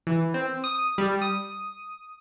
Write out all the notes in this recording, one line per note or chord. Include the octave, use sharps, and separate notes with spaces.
E3
C4
D#6
G3
D#6